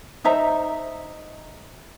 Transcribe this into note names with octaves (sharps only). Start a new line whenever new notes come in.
D#4 C5 E5 A#5